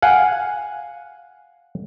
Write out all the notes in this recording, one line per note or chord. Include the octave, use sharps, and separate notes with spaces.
F5 F#5 G#5